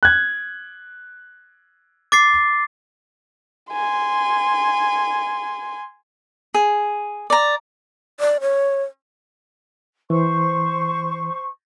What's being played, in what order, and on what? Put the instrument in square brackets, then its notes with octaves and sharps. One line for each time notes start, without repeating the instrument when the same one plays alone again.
[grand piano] F#6 G#6
[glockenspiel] D6 A6 C7
[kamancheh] G#5 C6
[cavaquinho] G#4
D5 A#5
[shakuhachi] D5
C#5
[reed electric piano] E3 [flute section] C5 C#6